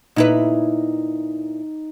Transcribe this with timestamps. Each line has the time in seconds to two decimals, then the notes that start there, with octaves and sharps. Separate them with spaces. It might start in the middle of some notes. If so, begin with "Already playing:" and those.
0.16 A#2 D#4 E4 B4